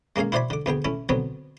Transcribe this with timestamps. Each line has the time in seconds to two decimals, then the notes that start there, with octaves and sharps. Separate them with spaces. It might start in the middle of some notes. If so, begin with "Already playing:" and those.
0.16 G#3 A#3 C#4 G#4 F5
0.32 E4 F#4 C5 D5 G#5 B5
0.50 D3 D6
0.66 D2 B3 G#4 G5
0.85 A3 C#4 E4
1.09 D3 F#3 B3 C4 C#5